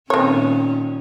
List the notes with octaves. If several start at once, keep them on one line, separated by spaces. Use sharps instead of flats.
A#2 D#3 C4 C#4 C#5